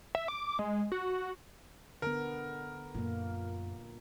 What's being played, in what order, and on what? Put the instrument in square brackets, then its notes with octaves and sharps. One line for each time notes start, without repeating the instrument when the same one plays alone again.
[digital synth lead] E5
D6
G#3
F#4
[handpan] D3 B3 [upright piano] A#4
[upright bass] F#2 [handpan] A#2 A#3